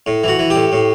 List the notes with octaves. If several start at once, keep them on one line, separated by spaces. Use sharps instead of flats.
A2
E3 F#4
E3
G4
A2
A2